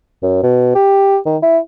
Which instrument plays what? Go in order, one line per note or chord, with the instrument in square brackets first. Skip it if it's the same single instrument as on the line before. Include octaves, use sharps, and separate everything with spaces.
[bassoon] F#2
B2
G4
D#3
E4